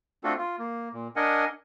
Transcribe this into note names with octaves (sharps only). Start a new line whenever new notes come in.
A3 C4 D4 F4 F#4 A4
F4
A#3
A#2
D4 A#4 D#5 F#5 G#5